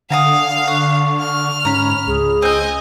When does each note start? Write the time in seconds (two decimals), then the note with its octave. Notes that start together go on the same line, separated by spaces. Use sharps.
0.10 D3 F5 F#5 G#5 A#5 D#6
0.67 F#5 C#6
1.20 F6
1.65 G#2 C#4 A#5 B5
2.07 C#2 G#4
2.42 C4 D#5 G#5 G6